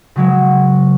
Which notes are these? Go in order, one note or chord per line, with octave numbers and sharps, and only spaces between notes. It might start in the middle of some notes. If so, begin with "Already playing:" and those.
C#3 F#3 G#3